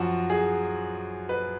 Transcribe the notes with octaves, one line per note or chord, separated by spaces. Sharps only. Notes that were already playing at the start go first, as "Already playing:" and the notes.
Already playing: F#2 F3 F#4
G#4
B4